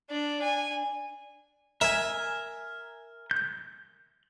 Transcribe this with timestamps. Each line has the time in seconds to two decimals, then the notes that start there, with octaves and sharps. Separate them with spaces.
0.10 D4 D5
0.42 G#5
1.81 A#4 E5 G#5
3.31 G6